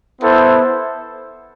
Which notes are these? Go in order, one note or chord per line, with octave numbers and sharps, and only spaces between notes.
B3 E4 A4 C5